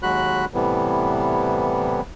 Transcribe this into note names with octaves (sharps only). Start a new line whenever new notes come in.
D#2 F#3 G#3 F#4 B5 F#6
A2 C3 E3 G3 B3